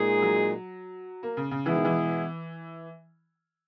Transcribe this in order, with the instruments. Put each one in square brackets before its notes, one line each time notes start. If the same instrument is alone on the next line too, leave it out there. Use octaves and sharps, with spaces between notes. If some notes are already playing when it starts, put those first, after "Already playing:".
Already playing: [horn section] A#2 G#3 D#4 G#4
[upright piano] F#3
A#3
C#3
C#3
[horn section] B2 G#3 B3 E4 G#4 [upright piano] E3
[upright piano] D#3
E3